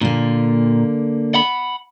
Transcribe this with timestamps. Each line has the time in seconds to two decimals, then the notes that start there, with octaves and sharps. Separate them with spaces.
0.01 A#2 D3 A#3
1.34 F#5 B5